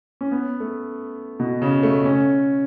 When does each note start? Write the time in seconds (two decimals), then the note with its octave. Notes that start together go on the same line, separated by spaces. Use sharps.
0.21 C#4
0.31 B3
0.60 A3
1.40 B2
1.62 C#3
1.83 A3
2.05 C#4